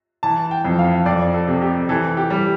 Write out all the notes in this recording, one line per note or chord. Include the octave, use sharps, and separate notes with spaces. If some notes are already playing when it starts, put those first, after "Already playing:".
E3 A5
G5
F2
F5
F2 D5
A4
C3
G4
E3 A4
G4
G3